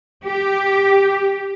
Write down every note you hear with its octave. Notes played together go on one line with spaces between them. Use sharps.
G4